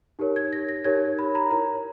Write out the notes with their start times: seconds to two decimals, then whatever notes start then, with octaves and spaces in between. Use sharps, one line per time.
0.19 D#4 G4 A#4 C#5
0.36 G#6
0.53 A#6
0.69 A#6
0.84 D#4 G4 A#4 C#5 G#6
1.19 B5
1.35 A#5
1.50 E4 A#4 C#5 A#5